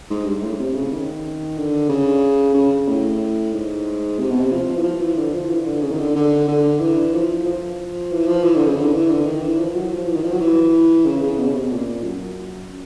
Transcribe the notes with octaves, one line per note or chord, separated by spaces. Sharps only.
G#2
G2
G#2
A2
C3
C#3
D#3
D3
C#3
C#3
A2
G#2
C3
B2
C3
F3
E3
F3
E3
D3
F3
E3
D3
C#3
D#3
D3
D3
D3
E3
F3
F3
E3
F3
E3
D3
C#3
D3
E3
D3
D#3
E3
F3
F#3
F3
E3
D#3
F3
F#3
E3
C#3
C#3
B2
C#3
C3
B2
A#2
F#2